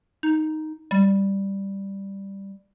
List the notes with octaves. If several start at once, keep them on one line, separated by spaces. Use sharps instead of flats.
D#4
G3